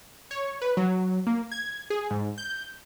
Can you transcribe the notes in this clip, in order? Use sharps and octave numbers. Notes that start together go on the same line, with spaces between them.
C#5
B4
F#3
A#3
G#6
G#4
G#2
G6